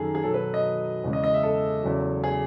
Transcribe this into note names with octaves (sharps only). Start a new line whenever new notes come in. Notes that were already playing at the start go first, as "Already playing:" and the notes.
Already playing: F#2 D#3 G#4 A4
G#4
B2 F#3 A4
B4
D#5
E2 C#3 G#3
D#5
D#5
E5
A4
E2 C#3 F#3
G#4